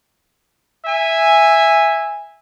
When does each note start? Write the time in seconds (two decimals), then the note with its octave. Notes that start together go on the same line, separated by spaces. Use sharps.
0.86 E5 G#5